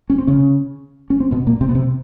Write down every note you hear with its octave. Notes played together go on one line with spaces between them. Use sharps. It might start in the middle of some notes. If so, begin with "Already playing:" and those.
C#4
C4
C#3 C#4
C#4
C4
B2 B3
A#2 A#3
C3 C4
B3
C3 C4